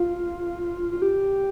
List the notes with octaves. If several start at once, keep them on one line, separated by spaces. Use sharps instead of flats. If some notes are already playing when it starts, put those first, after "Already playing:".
Already playing: F4
F4
G4